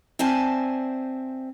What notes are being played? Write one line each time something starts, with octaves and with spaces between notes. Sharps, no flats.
C4 C5 D5 E5 G#5 A5